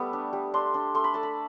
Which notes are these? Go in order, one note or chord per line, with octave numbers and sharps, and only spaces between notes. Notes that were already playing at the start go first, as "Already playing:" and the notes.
Already playing: G3 A3 B3
D4
G3
D4 C6
D4
A3 C6
B5
A3 A5
B5